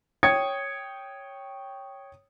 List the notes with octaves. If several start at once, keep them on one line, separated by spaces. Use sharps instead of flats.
C#5 G5 D#6 G#6 C#7